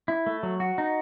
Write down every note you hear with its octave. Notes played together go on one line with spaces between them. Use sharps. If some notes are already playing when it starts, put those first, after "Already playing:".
E4
A3
F#3
F#4
D#4